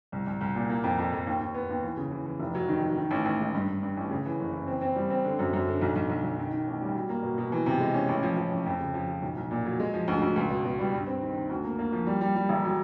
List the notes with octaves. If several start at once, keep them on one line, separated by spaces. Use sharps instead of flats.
C2
C2
C2
A#2
A#3
F2
F2
F2
D#2
D#2
B3
D#2
E3
C#3
E3
E3
F1
F#3
D#3
F#3
D#3
A1
A1
G#2
G2
G2
G2
A1
C#3
E3
F#1
E3
C4
C4
G3
C4
D3
F#2
F#2
D3
B1
B1
B1
B1
D#3
D#3
A1
G3
F#3
A#3
B2
B2
E3
C3
G#3
C#4
A1
F3
F3
A1
F2
C#3
F3
F3
B1
B1
A#2
F#3
G#3
F3
D2
D2
C#2
B2
B2
G3
G2
C4
D#3
D#3
D2
A#3
A#3
F3
G3
G3
G3
E1
F#3